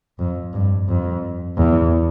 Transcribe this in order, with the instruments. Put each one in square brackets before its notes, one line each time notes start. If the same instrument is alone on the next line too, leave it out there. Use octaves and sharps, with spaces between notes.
[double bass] F2
G2
F2
E2